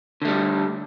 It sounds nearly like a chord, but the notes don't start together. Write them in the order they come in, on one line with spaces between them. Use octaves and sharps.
D3 A3 G3